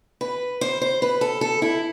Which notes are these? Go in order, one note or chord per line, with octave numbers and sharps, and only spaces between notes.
B4
C5
C5
B4
A4
A4
E4